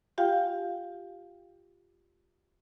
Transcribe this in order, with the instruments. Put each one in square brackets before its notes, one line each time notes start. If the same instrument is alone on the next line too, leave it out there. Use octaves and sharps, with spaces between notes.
[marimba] F4 G4 F5 G5 G#5